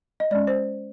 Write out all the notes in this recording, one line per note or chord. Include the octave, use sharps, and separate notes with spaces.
D#5
G#3 C#4 D5
C5